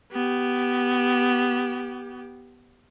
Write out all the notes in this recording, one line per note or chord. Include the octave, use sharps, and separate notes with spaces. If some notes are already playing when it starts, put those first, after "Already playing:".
B3 G4